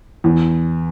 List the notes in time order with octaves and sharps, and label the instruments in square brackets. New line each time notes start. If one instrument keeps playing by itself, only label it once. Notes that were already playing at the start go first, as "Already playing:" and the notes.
[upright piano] E2